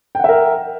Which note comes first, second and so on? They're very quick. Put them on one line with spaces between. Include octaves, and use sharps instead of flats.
G5 F#5 E5 A#4